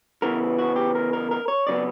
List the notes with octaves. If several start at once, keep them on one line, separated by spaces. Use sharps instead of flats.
C#3 E3 B3 A#4
F#4
G4
A#4
A#4
A#4
C#5
C#3 F#3 B3 D5